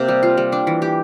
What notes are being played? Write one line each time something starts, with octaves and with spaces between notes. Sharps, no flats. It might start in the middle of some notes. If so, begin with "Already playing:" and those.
Already playing: C3 A#3
G3
F4
G3
D4
E3
G4